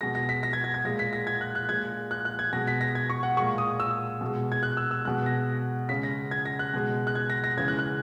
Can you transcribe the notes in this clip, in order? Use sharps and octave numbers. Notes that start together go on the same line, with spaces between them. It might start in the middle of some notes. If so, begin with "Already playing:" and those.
B2 G#3 A#6
A#6
B6
A#6
G#6
G#6
G#6
A#2 G#3 A#6
B6
A#6
G#6
F#6
F#6
A#2 G#3 G#6
F#6
F#6
G#6
B2 G#3 A#6
B6
A#6
G#6
C#6
F#5
A#2 G#3 C#6
D#6
E6
B2 G#3
G#6
F#6
E6
E6
B2 G#3 F#6
A#6
C#3 G#3 B6
A#6
G#6
A#6
F#6
B2 G#3
F#6
G#6
A#6
A#6
C#3 E3 G#3 G#6
F#6
F#6